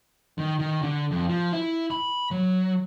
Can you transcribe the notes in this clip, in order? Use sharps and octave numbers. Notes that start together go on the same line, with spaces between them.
D#3
D#3
D3
F2
F3
E4
B5
F#3